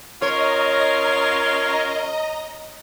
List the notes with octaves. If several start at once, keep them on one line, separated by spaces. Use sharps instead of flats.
C#4 F4 A#4 C#5 D#5 A#5